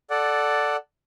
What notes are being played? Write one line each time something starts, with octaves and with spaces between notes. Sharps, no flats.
A4 D5 F#5